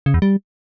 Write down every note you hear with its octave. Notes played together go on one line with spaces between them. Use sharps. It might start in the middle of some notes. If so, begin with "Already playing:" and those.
C#3
E2
G3